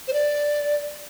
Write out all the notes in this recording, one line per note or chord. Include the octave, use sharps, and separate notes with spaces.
C5
D5